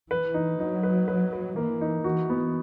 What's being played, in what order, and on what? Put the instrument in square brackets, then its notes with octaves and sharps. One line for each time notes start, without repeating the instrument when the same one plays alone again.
[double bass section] E3 [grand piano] B4
[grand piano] D#4
[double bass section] F#3 [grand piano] D#4
[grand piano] B4
B4
B4
[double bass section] E3 [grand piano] A#3
[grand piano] D#4
[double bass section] E3 [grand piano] F#4
[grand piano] B3